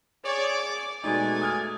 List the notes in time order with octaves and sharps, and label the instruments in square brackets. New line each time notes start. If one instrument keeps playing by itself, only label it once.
[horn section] G#4 D5 [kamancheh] C#5
[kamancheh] D6
[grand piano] B2 G#3 D#4 [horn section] A3 G#5 [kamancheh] D5
[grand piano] D#6 F6 G#6